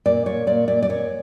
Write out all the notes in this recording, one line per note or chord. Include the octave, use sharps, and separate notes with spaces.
A#2 D5
A#2 C#5
A#2 D5
A#2 D5
D5
A#2 C#5